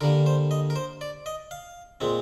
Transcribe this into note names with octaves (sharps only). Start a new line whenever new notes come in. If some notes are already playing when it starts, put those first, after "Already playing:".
D3 G3 A#3 A#4
C5
D#5
A#4
C5
D5
D#5
F5
A#2 G#3 C4